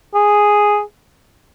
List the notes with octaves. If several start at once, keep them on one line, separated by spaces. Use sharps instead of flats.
G#4